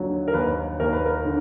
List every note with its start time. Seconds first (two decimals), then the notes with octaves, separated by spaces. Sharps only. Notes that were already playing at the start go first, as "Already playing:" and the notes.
Already playing: D#2 D3 F#3
0.28 A#4
0.34 D#2 B4
0.80 D#2 A#4
0.93 B4
1.06 A#4
1.25 D3